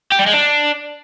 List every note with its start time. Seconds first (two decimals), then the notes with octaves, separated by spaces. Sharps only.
0.12 G4
0.19 G3
0.26 G#3
0.33 D4